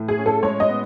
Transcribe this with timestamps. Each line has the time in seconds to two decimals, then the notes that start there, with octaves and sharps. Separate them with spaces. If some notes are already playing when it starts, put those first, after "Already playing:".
Already playing: A2 E3 A3
0.08 G#4
0.18 C#4
0.26 A4
0.43 G#3 C#5
0.60 D#5
0.69 B3